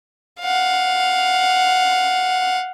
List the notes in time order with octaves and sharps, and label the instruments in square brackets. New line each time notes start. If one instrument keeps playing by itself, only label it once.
[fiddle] F5 F#5